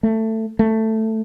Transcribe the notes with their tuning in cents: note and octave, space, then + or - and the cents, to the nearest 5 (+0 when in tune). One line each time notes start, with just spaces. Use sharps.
A3 +15
A3 +10